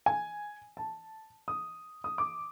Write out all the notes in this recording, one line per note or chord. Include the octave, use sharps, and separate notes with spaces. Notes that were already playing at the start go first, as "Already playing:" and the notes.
G#5
A5
D#6
D#6
D6